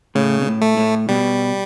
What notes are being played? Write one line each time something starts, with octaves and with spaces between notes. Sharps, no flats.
A2 C#3
B2
A2
A3
A2
B2 G3